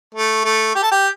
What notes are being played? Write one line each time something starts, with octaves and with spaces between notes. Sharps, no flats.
A3
A3
G4
A4
G4